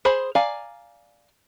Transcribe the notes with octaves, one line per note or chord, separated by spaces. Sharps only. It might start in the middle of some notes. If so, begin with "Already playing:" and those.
G#4 C5 B5
D5 F5 G#5 A#5